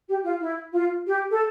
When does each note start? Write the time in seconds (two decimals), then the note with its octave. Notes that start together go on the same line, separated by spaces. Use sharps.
0.08 G4
0.25 F4
0.41 E4
0.73 F4
1.06 G4
1.31 A4